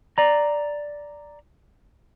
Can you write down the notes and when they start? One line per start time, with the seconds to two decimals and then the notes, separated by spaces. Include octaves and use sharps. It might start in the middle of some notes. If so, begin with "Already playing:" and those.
0.18 D5 A#5